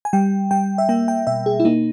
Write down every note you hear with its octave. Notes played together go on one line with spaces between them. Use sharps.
G#5
G3 G5
G3 G5
E5
A#3 G5
G5
B2 E5
G#4
E4
A#3 D#4